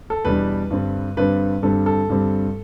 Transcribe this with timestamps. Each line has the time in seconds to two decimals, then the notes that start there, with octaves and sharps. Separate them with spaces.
0.10 A4
0.25 E2 B2 G3 B3 D4 B4
0.70 G2 D3 G3 C4
1.17 G2 D3 G3 C4 B4
1.63 G2 D3 G3 C4 A4
1.86 A4
2.09 G2 D3 G3 C4